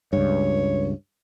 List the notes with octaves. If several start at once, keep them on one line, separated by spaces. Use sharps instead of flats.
C#2 G2 C#5